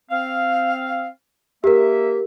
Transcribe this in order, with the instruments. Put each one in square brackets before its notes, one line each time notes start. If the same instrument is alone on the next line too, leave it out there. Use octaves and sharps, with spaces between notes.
[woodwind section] C4 F5
[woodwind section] A#3 E5 [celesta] G4 A#4